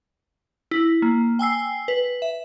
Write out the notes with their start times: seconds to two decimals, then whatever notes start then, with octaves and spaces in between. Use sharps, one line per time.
0.71 E4
1.02 A#3
1.39 G5 G#5 E6 C7
1.88 B4
2.22 E5